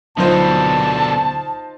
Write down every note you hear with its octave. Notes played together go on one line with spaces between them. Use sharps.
D2 B2 D3 F#3 D#4 F4 C5 A5